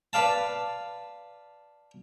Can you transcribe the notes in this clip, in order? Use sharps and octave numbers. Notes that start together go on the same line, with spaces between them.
B4 D5 F5 A5